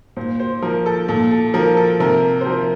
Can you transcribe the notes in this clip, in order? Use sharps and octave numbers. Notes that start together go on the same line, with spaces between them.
A#2 C5
C5
F3 A#4
A4
A#2 A4
A4
F3 A#4
A4
C3 A#4
C5
F3 A#4